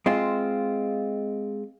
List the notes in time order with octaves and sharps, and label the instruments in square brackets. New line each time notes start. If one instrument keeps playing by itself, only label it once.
[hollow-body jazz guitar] G#3 C4 F4